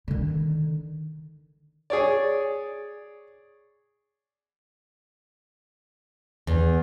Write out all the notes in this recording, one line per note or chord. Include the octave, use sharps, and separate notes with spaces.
D3 D#3
G#4 C#5 D5
E2